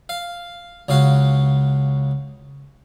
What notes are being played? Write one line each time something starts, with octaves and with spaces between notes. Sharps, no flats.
F5
C#2 C#3 F#4 F5